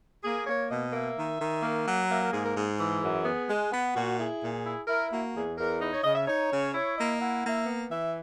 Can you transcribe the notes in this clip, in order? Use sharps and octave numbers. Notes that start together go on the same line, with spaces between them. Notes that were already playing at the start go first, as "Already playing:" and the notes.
A#3 G#4
A#3 C#5
B2 D#5
A#3 E5
D#3
D#3
A#3
F#3
A#3 E5
A#4
G#2 G#4
A#4
G#2 G#4
E3
F#2
B3
G#3
B3
A#2 F#4
E4 G#4
A#2
E4
E4 A#4
A#3 F#4
E2 G#4
E2 A#4
D#4 B4
C#5
C#3 D#5
E5
D#4 C#5
C#3
E4 C#5
A#3 D#5
E4 F#5
A#3 E5
B3
E3 E5